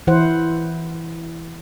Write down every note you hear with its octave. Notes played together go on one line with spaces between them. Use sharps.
E3 E4 C5 F#5